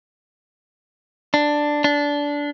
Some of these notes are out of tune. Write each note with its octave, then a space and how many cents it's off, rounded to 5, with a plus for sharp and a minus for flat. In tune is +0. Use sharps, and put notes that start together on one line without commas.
D4 +5
D4 -15